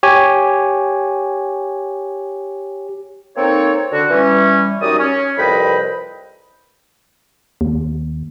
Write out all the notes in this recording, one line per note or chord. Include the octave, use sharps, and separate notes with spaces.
G4 C#5 G#5
A#3 C4 D#4 A4 C#5
D3 F#4
E3 G3 C#4
F#2 G3 D#4 F#4 D5 D#6
C#4
C2 F2 B4 D#5 G5 B5
D#2